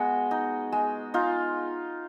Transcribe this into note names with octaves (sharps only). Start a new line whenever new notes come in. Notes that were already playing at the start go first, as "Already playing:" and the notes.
Already playing: G#3 B3 F#4
D#4
G#3
D#4 F4